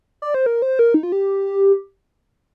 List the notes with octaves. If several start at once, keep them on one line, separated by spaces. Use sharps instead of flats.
D5
C5
A#4
C5
A#4
D#4
F4
G4